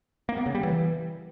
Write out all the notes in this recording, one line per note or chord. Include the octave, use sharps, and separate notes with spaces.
A#3
B3
C#3
G3
E3